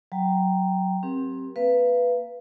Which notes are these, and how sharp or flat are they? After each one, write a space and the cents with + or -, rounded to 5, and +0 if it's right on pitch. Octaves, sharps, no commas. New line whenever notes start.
F#3 +5 G5 +0 A#5 +0
C4 +20 G4 +0 A#4 +40
A#3 +0 B4 +0 F5 -30